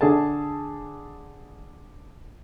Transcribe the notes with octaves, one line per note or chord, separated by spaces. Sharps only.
D3 G#4 A4 A5